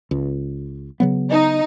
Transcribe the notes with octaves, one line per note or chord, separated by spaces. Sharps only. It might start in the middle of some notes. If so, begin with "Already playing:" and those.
C#2
C#3 F#3 B3
D#4